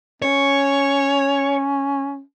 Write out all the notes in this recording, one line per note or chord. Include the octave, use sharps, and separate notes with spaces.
C#4 C#5